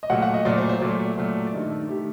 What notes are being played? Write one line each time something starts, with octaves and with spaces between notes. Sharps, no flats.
D#5
A#2 F#3 A3 F#5
F#5
D#5
A#2 F#3 A3 D5
C5
C5
A#2 F#3 A3 D5
A#2 F#3 A3
D5
G2 D#3 A3 D#5
A4
D#3 A3 G4